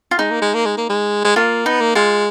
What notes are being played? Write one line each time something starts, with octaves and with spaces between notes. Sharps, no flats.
F4
G#3 D#4
A#3
G#3
A#3
G#3
A#3
G#3
G#3
A#3 F4
B3 D#4
A#3
G#3 F4